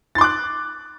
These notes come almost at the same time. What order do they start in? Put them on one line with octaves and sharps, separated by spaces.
A6 C6 D6 F#6